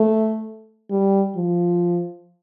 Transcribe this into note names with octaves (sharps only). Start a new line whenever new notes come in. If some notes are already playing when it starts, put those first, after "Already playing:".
Already playing: A3
G3
F3